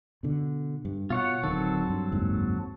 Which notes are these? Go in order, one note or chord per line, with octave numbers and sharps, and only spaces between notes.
B2 D3
G2
B2 F4 C#5 F#5
D1 D#3 F#3 C4 A4
G2
F#1 D#2 G#2